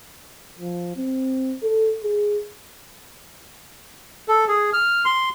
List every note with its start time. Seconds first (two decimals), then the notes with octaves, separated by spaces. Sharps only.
0.59 F3
0.96 C4
1.63 A4
2.03 G#4
4.28 A4
4.48 G#4
4.73 F6
5.05 C6